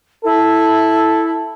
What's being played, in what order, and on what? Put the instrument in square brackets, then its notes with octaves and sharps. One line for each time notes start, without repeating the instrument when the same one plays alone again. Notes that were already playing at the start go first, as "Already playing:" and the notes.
[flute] E4 [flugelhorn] A4